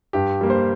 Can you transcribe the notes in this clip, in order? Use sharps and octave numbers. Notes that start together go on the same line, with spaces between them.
G2 G4
G3 A#3
C5